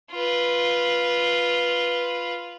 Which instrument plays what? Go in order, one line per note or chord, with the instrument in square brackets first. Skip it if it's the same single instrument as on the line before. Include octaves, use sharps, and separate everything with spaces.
[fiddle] F4 B4